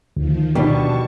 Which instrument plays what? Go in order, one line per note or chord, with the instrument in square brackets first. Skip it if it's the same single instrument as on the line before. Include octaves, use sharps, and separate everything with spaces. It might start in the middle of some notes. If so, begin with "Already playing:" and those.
[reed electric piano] D2 [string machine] D#3 F3
[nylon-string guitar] B2 G3 [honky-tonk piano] D#3 D4 [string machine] A5 C#6